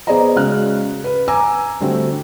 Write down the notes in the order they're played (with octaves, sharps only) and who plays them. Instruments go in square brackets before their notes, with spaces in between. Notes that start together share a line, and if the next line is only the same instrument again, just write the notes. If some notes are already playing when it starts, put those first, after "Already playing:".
[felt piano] B3 G#4 C5 D5 D#5 A#5
C#3 G#3 F#4 F6 F#6
B4
G#5 A#5 D6 E6
D3 G3 A3 C4 F#4